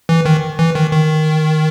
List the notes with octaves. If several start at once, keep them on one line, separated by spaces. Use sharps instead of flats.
E3
D#3
E3
D#3
D#3